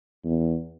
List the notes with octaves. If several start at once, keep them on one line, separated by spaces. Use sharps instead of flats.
E2